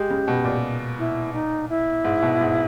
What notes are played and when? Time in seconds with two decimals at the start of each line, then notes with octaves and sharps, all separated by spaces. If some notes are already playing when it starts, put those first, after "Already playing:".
Already playing: G#3 G4
0.10 C#3
0.28 B2
0.44 A#2
0.98 E4
1.33 D#4
1.69 E4
2.05 G#2
2.22 B2
2.41 G#2